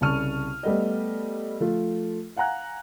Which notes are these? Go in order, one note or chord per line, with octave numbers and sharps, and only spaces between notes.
C2 C#3 A5 C#6 F6 D#7
G3 A3 B3 D#5
F3 A3 F4
F5 F#5 G#5 A#5 F#6